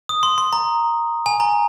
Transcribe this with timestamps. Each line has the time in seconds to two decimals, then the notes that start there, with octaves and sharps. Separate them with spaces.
0.09 D#6
0.23 C6
0.38 C6
0.53 A#5
1.26 G#5
1.40 A#5